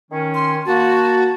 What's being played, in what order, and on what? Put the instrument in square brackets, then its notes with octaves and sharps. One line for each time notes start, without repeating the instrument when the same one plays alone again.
[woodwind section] D#3 C#4
[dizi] C6
[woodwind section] A#3 A5 [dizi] F#4